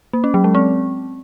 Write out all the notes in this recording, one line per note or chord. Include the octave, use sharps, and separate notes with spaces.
A#3
C#4
F#3
G#3
C4